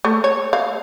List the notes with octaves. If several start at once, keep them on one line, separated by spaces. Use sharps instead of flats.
A3
C#5
F5